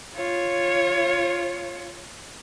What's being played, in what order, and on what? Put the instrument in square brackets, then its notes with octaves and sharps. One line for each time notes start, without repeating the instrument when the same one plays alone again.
[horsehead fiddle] F4 C#5